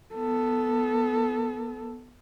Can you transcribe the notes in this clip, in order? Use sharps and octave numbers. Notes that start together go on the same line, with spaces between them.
B3 A4